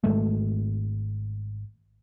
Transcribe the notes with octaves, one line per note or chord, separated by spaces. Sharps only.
G#1 G#3 A3